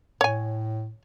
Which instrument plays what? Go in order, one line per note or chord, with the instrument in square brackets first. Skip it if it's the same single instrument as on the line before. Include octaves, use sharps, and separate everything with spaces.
[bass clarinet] A2 [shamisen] C#5 G#5